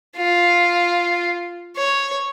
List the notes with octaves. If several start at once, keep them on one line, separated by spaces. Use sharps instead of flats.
F4
C#5